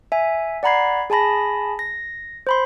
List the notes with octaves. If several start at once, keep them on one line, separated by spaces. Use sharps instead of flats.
E5 G#5
D5 F#5 A#5 B5 G#6 C7
G#4 G#5 A5 B5 A#6
A#6
C5 B5 C6